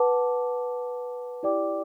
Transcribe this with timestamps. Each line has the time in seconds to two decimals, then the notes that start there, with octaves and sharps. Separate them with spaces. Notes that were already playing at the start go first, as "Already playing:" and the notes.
Already playing: B4 F#5 A5 D6
1.43 E4 G4 D5 G5 D6